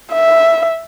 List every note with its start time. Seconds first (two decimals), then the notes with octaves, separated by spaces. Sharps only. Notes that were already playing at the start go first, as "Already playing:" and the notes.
0.13 E5